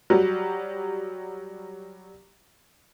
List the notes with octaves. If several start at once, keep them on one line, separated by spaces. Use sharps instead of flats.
F#3 G3